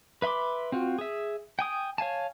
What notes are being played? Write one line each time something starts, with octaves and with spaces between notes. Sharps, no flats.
B4 E5 B5 C6 D6
C4 F4 F#4
G#4 E5
G5 G#5 D#6
C#5 F5 G#5 A5